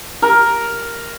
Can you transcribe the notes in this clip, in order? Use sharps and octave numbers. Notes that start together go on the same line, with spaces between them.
A#4